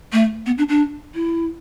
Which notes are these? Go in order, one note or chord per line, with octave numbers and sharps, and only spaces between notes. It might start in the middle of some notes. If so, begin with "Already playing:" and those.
A3
B3
D4
D4
E4